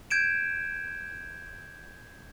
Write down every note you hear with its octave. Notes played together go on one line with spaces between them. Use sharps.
G6 G#6 D7 E7